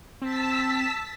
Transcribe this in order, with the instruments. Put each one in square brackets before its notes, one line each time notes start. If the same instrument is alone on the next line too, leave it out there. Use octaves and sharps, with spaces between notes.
[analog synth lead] C4 [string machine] A5 E6 B6